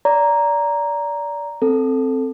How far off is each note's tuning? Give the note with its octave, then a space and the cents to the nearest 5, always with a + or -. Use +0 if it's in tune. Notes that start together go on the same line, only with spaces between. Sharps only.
D5 -25 A#5 +0
C4 +0 A4 +0